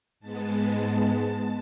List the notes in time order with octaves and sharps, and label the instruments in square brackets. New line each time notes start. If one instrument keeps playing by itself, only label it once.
[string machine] G#2 G#3 B3 A5